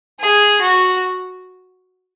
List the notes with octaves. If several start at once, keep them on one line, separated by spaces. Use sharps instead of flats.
G#4
F#4